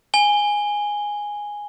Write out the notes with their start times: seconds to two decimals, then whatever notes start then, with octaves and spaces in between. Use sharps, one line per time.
0.14 G#5 G7